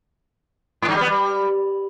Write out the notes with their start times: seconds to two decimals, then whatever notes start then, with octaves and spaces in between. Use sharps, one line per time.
0.82 G#2
0.89 G2
0.95 G3
1.01 B3
1.07 G3